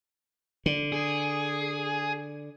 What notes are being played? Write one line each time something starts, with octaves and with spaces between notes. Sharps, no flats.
D3
G#4